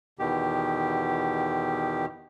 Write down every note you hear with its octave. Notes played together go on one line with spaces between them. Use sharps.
E2 B2 D#3 G4